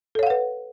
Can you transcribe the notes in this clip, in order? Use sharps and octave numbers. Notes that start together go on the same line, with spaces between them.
A4 B4 C#5 F5 F#5